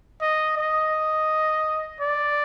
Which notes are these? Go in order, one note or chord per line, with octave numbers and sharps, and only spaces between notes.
D#5
D#5
D5